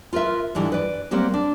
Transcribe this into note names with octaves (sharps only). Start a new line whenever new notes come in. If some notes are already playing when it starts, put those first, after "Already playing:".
F4 A#4 B4 E5
G#2 D3 E3 G3
B4 D5
F#3 G3 A#3 C4
D4